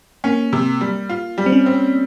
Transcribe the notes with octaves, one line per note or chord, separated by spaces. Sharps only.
A#3 C#4
C3
G3
F4
G3
C4
C#4
C4